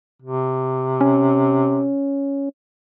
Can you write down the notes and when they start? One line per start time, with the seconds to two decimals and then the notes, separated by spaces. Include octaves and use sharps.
0.22 C3
1.01 C#4